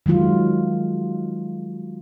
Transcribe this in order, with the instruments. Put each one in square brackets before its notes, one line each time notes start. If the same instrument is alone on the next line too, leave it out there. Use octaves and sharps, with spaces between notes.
[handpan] D#3 F#3 G#3 F4